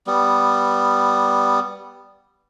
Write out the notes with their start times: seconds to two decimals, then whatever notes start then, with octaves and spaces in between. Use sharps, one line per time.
0.07 G3 B3